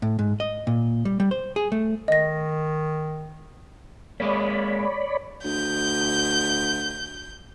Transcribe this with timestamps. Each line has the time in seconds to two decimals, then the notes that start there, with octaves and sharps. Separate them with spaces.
0.02 A2
0.19 G#2
0.40 D#5
0.67 A#2
1.05 G3
1.20 G3
1.31 C5
1.56 G#4
1.72 A3
2.08 D#3 D#5 A#6
4.20 G#3 A#3 C#5 D5 B5
5.44 D2 G6